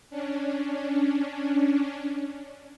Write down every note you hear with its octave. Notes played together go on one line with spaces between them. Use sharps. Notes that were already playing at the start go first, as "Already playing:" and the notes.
C#4 D4